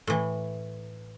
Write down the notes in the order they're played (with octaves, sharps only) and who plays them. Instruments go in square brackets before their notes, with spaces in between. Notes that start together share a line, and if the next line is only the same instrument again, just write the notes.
[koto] A2 E3